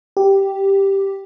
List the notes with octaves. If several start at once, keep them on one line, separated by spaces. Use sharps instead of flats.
G4